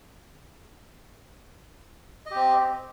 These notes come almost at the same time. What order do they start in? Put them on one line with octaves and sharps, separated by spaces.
D#5 G4 C4